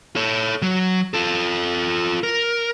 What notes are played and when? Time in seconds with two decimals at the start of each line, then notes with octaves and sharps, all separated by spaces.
0.16 A4 C#5
0.62 F#3
1.14 F4 A4
2.23 A#4